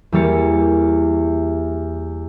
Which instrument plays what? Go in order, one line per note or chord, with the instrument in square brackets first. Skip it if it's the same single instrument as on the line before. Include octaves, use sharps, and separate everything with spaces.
[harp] E2 G3 A#3 C#5 A6 C#7